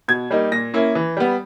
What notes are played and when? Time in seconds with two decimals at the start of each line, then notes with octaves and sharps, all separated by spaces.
0.08 B2 G#6
0.31 G3 A#3 D#4
0.52 A#2 A#6
0.74 A#3 C#4 E4
0.95 E3
1.17 G3 B3